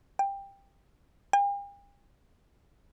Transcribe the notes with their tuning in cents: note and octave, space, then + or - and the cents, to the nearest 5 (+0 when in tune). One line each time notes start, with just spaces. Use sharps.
G5 +15
G5 +45